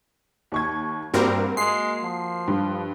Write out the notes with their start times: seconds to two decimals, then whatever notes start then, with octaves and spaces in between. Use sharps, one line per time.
0.52 D#2 C#6 G#6
1.14 G2 G3 A#3 C4 F#4 A#4
1.57 G#3 C7
2.03 F3
2.48 G2